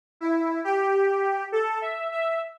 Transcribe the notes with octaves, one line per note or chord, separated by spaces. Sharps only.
E4
G4
A4
E5
E5